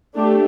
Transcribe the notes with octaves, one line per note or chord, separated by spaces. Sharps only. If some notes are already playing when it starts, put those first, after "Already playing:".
A3 D4 G4